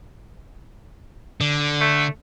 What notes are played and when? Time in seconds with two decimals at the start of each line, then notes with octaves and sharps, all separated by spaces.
1.41 D3
1.81 A3